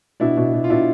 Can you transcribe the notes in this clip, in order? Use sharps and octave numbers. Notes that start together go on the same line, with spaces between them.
B2 D4 E4
B2
B2
F4
B2 D4 E4